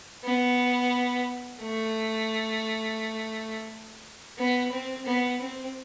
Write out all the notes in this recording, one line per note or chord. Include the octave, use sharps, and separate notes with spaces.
B3
A3
B3
C4
B3
C4